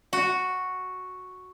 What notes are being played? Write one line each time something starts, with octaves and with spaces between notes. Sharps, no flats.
F#4